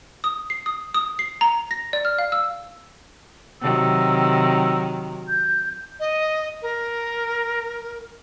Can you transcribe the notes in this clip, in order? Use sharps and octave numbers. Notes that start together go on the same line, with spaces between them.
D#6
C7
D#6
D#6
C7
A#5
A#6
D5
F6
F5
E6
C3 D#3 F#3 E6
G6
D#5
A#4